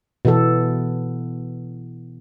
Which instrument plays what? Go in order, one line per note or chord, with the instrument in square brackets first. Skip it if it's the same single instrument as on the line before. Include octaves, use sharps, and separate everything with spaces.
[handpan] B2 E3 B3 A4